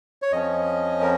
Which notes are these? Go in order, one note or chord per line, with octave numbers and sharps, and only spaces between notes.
C#5
F2 F3 C#4 D#5
A#4